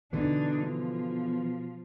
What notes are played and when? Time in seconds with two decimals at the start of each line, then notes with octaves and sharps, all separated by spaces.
0.13 B2 D3 E3 D4 D#4
0.63 F3